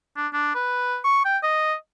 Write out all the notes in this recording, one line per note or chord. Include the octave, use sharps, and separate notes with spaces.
D4
D4
B4
C#6
G5
D#5